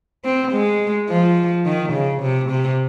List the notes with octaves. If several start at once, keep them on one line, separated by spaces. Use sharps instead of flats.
C4
G#3
F3
D#3
C#3
C3
C3